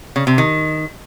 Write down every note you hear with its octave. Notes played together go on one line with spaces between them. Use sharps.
C#3
C3
D#3